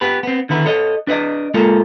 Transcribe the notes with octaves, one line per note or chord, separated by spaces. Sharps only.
B3 G4 B4
B3 C4
D3 D#3 B3 E4
A4 C#5 D#5
D4 B4 D5 D#5
G#3 A#3 F4 A4 A#4